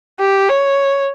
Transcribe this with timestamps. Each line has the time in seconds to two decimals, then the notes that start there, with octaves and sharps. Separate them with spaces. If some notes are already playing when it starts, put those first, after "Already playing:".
0.20 G4
0.49 C#5